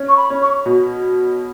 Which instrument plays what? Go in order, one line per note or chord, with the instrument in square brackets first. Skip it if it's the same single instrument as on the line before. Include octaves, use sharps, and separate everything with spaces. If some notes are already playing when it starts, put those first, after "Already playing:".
Already playing: [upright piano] C#4
[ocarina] C#6
B5
[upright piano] C#4
[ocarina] C#6
[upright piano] B2